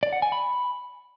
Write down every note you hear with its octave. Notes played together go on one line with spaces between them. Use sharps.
D5
F#5
G#5
B5